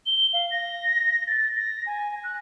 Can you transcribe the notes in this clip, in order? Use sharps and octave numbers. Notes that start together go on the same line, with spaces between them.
G7
F5
A#6
A6
A#6
G#5
F#6